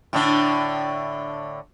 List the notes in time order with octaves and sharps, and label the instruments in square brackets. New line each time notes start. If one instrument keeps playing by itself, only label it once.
[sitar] A2 D3 D4